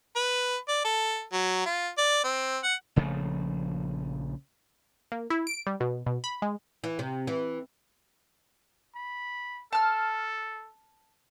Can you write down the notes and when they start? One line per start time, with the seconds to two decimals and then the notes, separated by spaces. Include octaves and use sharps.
0.16 B4
0.68 D5
0.85 A4
1.33 F#3
1.66 F4
1.98 D5
2.24 C4
2.64 F#5
2.96 A#1 C#3 F3 A3
5.12 A#3
5.30 E4
5.47 D7
5.67 G3
5.80 B2
6.06 B2
6.24 B5
6.42 G#3
6.84 E3
6.99 C3
7.27 E3
8.95 B5
9.73 A4 A5 F6